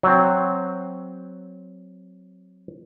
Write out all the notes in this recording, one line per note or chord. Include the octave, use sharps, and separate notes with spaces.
F#3 C4